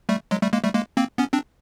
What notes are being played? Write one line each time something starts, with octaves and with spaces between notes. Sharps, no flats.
G3 A3
F#3 G#3
G3 A3
G#3 A#3
G3 A3
G#3 A#3
A#3 C4
B3 C#4
C4 D4